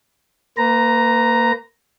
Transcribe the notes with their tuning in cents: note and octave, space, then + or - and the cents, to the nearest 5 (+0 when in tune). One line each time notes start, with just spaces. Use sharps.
A#3 -20 B4 +35 A#5 +0